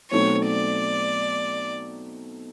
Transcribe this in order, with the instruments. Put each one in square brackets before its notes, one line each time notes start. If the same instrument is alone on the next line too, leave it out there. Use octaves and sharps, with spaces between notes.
[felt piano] B2 F#3 A3 C4 D#4 [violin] C#5
[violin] D5